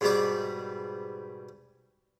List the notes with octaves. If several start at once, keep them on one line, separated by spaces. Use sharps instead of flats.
G#2 B2 G3 D5